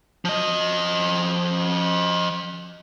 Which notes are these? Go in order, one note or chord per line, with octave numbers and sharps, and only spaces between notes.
F3 D#5